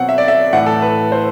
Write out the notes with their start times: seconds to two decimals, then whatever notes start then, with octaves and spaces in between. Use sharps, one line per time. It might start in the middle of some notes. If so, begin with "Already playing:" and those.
Already playing: B2 F#3 C4 F#5
0.09 E5
0.18 D5
0.28 E5
0.53 A2 E3 A3 F#5
0.66 A4
0.82 B4
1.12 C5